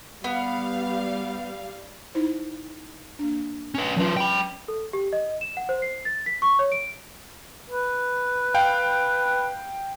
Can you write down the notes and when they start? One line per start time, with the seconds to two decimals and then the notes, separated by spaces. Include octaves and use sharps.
0.24 G3 B3 F5
2.15 D#4 E4 C5
3.19 A#3 D4
3.75 C#4 B4
3.97 E3 F#3 C#4 F4 B4
4.17 G5 B5
4.68 A4
4.93 G4
5.13 D#5
5.41 E7
5.57 F#5
5.69 C5
5.82 C7
6.05 A6
6.26 B6
6.42 C#6
6.59 C#5
6.72 D7
7.70 B4
8.54 F5 G5